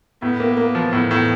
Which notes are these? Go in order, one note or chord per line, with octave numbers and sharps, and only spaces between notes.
A2 B3
A#3
A#3
F3
A2 B3
A2